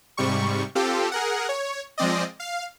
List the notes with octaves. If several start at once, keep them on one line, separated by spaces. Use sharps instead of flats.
G#2 C3 G3 C#6
C4 F4 G4 A4
G#4 A#4 F#5
C#5
F3 G#3 C4 D5 D#5
F5